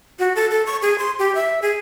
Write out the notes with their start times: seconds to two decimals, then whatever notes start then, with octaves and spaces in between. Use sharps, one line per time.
0.19 F#4
0.36 A4
0.51 A4
0.66 C#6
0.82 G#4
0.98 C6
1.19 G4
1.35 E5
1.62 G#4